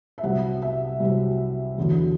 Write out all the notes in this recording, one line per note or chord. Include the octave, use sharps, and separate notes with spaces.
E5
C2 C3 F#3 F#5
E5
C2 C3 F#3
E2 D3 F#3